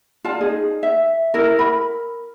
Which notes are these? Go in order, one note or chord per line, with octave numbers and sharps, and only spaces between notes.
F4 D5 A5
D#4 G#4
E5
E4 A#4
A#4 B5